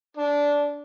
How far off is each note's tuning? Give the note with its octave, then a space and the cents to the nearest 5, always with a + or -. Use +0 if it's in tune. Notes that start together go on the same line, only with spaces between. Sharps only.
D4 -15